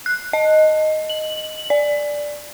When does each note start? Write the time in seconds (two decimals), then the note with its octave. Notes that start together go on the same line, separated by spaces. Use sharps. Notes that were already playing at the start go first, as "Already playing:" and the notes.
0.06 F#6
0.33 D#5
1.09 F#7
1.70 D5